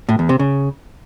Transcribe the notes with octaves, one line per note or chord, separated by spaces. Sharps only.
A2
E2
C3
C#3